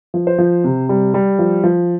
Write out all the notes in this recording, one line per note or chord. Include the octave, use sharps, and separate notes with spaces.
F3
C5
F3
C3
G3
G3
F3
F3